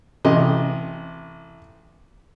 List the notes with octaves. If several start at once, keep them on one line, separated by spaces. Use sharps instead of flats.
A1 C3 D#5